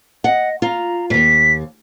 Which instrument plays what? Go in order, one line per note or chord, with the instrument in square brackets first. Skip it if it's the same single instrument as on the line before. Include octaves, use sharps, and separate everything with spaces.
[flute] D#5 [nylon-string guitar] F#5
[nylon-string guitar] F4 [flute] A#5
[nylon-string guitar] D#2 G#2 [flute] B6